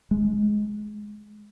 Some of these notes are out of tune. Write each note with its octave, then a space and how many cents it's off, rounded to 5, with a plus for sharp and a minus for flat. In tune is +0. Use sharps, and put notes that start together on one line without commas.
G#3 +15